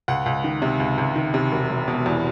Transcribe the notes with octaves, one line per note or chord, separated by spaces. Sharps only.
C#2 F#5
C#2
D#3
C3
C#2
C#2
D#3
C3
E1
E1
B2
E2